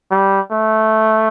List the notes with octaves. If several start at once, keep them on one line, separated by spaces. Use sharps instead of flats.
G3
A3